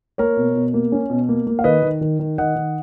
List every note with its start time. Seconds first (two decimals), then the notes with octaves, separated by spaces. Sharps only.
0.18 A#3 A#4 C#5
0.37 B2
0.55 B2
0.74 A#3
0.92 C#4
1.10 B2
1.29 A#3
1.47 A#3
1.59 F5
1.64 D#3 B4 D#5
1.82 D#3
2.01 D#3
2.19 D#3
2.38 D#3 D#5 F#5
2.56 D#3